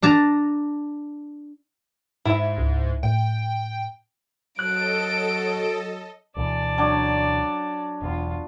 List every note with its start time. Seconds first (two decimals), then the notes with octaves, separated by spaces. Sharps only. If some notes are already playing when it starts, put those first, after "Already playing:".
0.02 D4 A5 A#5
2.25 G#2 E4 E5
2.58 C#2
3.03 A2 G5
4.59 F#3 A4 C#5 D#5 F#6 D7
6.36 D2 B2 E3 D5 A5
6.78 F#3 D4
8.02 E1 E2 B3 F4